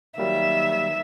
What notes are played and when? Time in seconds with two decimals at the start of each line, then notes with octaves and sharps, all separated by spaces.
0.18 D#3 F#3 G3 A#3 E5